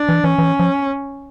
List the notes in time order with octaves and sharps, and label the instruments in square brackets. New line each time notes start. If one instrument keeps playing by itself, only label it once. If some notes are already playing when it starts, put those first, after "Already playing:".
Already playing: [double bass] D4
[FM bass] E3
[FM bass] E3 [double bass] C#4
[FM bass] E3
F3